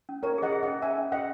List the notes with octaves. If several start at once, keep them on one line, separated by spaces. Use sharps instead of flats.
C#4
A#4 C#5 A#5
G#4 D#5 F#5
G#4
D#5 F#5
C#4
E5 G#5 A#5
C#4
C#4 D#5 F#5